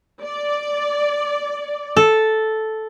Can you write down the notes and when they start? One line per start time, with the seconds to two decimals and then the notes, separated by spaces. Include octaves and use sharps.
0.22 D5
1.97 A4